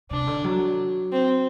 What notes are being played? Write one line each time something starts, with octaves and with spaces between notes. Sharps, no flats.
C3 D4
D3
F#3
C4